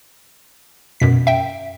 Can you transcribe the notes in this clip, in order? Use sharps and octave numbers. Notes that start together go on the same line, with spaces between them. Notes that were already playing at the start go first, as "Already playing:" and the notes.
F#2 B2 B6
E5 G5